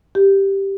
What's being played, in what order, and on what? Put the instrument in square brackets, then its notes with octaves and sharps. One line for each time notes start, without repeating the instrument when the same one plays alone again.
[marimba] G4